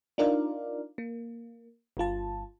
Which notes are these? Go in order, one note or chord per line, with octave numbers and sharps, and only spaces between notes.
D4 D#4 F4 A#4 D5 F5
A#3
G1 G2 F4 A5